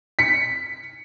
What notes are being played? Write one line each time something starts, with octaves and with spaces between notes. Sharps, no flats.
B6 C#7